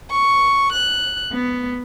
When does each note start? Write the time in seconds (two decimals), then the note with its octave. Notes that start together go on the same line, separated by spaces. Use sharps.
0.11 C#6
0.72 F#6
1.34 B3